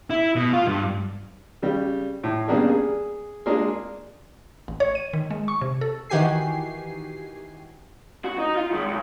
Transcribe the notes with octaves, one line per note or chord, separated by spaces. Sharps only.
E4
B2
F4
G2
C#3 G3
A2
C#3 G3 A#3 B3 D4 G#4
G#4
G#3 A#3 D4 F4 G#4
A1
C#5
D#7
D#3
G#3
C#6
C3
A4
D#3 E3 F#4 G4 G#5 C7
F#4
D#4
F4
D#3 G#3
B1